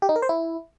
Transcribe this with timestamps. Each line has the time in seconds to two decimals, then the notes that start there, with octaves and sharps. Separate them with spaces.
0.02 G4
0.09 D#4
0.16 A#4
0.22 C5
0.29 E4